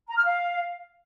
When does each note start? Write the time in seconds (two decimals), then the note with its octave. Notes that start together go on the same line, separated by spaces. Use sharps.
0.08 A#5
0.16 F6
0.24 F5